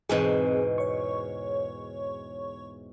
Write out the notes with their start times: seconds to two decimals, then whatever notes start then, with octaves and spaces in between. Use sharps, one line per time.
0.09 E2 G#2 B2 C4 G#4
0.78 C#5 C#6